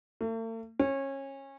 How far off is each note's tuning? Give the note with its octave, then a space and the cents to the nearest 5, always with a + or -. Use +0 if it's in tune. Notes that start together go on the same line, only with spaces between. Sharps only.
A3 +45
C#4 -25